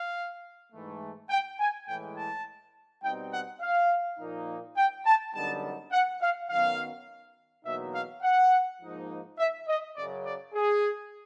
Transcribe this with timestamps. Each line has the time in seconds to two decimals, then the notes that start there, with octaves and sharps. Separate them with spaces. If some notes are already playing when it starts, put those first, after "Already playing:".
Already playing: F5
0.73 G#2 E3 A3
1.30 G5
1.60 G#5
1.88 A2 E3 G#3 G5
2.17 A5
3.03 B2 G3 C4 D#4 G5
3.33 F#5
3.61 F5
4.19 A#2 F3 A#3 D#4
4.77 G5
5.06 A5
5.34 F#2 D3 G3 B3 D#4 A5
5.93 F#5
6.22 F5
6.50 F#2 D#3 F#3 B3 F5
7.65 E2 B2 F#3 A#3 D#4 E5
7.95 F5
8.23 F#5
8.81 G#2 F3 A#3 D#4
9.39 E5
9.68 D#5
9.96 F#2 C#3 F#3 D5
10.26 D5
10.55 G#4